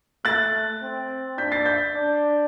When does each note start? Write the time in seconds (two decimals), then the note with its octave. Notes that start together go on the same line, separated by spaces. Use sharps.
0.25 A3 F#6 A6
0.82 C4
1.38 D4 G6 B6
1.51 A6 C7
1.66 G6 B6
1.95 D4